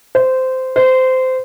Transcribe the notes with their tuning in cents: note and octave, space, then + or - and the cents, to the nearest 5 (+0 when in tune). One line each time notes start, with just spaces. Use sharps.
C5 -15
C5 -20